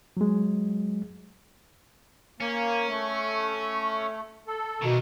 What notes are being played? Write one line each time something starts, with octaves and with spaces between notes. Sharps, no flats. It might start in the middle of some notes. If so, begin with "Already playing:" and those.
F#3 G#3
A#3 C#4
A3
A4
B2 D#3 E3